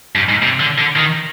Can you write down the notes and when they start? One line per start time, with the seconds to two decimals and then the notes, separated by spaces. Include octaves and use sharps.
0.15 G2
0.29 G#2
0.42 C3
0.60 D3
0.78 D3
0.96 D#3